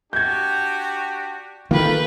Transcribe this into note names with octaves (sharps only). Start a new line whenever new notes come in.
D4 F#4 G4 G6 G#6
D#3 A#3 F4 A4 B4 G5